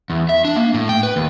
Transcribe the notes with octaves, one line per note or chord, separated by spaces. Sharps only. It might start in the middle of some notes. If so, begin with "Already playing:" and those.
E2
E5
D4
A#3
A2
G5
B4
D#2